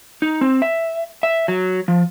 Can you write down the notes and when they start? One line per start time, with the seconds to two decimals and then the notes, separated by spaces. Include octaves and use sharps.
0.22 D#4
0.41 C4
0.62 E5
1.23 E5
1.48 F#3
1.88 F3